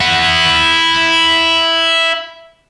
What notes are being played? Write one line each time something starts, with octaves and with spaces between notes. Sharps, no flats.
E4 F#5